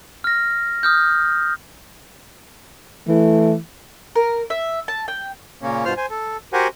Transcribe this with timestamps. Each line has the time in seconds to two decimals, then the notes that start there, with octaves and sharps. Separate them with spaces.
0.24 F6 A#6
0.83 D#6 F6 G6
3.08 E3 A3
4.16 A#4
4.50 E5
4.88 A5
5.08 G5
5.62 A#2 C#3 A#3 C#4
5.85 G2 B2 F4 C5 F6
5.97 C5 G#5
6.10 A4
6.53 F#4 G4 A#4 C5 F#5 G#5